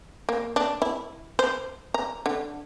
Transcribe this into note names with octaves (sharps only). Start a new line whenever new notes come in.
A#3
D4
E4
C5
A#5
D3